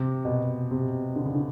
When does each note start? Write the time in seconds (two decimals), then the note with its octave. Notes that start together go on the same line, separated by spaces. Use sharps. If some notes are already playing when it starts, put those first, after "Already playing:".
Already playing: C3
0.25 B2
0.71 C3
1.16 D3
1.25 C#3
1.35 D3